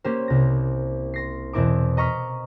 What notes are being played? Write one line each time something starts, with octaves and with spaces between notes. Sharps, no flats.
A#3 C#4 G4 C5
C2 A#6
C6 A#6 C7
E2 B2 C4 E4 A#4 D6
D#5 A#5 C#6 F6 B6